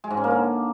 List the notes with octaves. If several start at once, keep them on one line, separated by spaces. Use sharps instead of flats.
G#3
G#2
C#4
A#3
D3